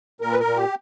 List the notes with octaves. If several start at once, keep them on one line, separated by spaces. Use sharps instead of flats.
A#2 A#4
B4
A#4
A#2
G4